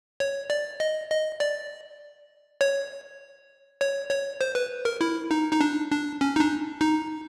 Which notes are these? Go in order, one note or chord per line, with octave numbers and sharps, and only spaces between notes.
C#5
D5
D#5
D#5
D5
C#5
C#5
C#5
C5
B4
A#4
E4
D#4
D#4
D4
D4
C#4
D#4
D4
D#4